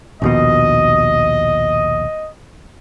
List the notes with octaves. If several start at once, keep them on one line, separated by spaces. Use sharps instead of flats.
A#1 D#2 B2 D#5